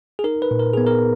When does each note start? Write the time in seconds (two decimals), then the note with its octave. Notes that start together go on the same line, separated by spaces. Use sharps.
0.19 G#4
0.24 D#4 A#4
0.42 B4
0.51 A#2
0.60 A#4
0.73 B3 G#4
0.87 A#4